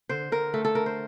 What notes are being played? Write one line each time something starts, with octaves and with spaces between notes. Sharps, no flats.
D3 C5
D3 A#4
A3 A4
A4
D3 A#4
C5